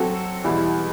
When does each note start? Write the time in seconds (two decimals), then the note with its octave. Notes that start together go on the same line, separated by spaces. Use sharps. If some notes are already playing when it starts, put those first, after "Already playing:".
Already playing: F#3 C4 F#4 A4
0.44 E2 B2 G3 B3 E4